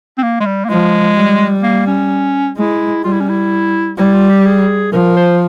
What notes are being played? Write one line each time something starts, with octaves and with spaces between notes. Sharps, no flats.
C4
A#3
G#3
G3
A#3
F3 G#3
G3
A#3
C#4
G#3 E4
G3 F4
E4
C#4
E4
G3 E4
F4
G4
G#4
F3 A#4
C5